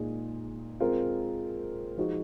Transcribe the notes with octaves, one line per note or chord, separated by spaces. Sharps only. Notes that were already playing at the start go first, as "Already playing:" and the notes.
Already playing: A#2 G#3 D#4 G#4
G#3 C4 F4 A#4
F3 G#3 D#4 F#4